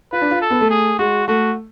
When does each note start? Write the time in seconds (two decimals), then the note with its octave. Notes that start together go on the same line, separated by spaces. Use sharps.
0.13 F4 B4
0.21 D4
0.31 F4
0.41 A4
0.50 B3
0.61 A3
0.70 G#4
0.99 G#3 F#4
1.28 A3 F#4